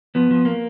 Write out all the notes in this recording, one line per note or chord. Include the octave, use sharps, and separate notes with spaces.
F3 B3
F3
A#3